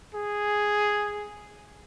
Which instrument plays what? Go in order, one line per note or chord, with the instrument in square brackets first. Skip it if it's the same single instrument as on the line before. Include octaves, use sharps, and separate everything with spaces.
[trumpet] G#4